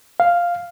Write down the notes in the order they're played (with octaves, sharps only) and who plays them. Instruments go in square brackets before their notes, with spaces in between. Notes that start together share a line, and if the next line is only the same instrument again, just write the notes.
[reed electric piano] F5